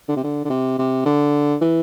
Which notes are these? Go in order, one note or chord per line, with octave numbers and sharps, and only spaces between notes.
D3
C3
D3
D3
C3
C3
D3
E3